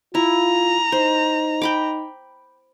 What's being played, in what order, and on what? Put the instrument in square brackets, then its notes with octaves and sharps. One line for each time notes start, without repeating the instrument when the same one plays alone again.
[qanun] E4 [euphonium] F4 [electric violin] A#5
[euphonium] D#4 [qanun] C5
[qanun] G5 B5 D6